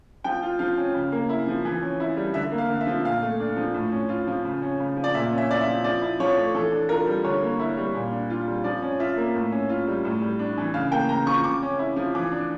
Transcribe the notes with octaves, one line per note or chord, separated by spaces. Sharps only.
F3 G5
F4
F3 F5
C#4
C#3
A#3
E4
F3
E3
C#4
E4
G3
D3 E5
A#3
F5
D3
E5
F3
A#2 F5
A3
D4
F3
A2
C#4
F4
F3
C#3
C#4
C#3
F3
D5
A#2 E5
C#4
E5
E4 D5
E5
F3
F3 D5
E4
F3 C#5
A3
E3 A4
D4
F4 A#4
G3
D3 C#5
A#3
E4
G3
A#2
D4
F4
G3
F3 D5
C#4
F4 E5
A#3
A2
C#4
F4
G3
A2
G3
D4
E3
C#3 F5
A#3 G5
C#3 A#5
F3 C#6
C#3 D6
C#4
E4
F3
E3 D6
D4